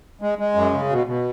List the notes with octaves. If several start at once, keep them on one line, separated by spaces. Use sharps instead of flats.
G#3
G#3
F#2
C#3
B2
B2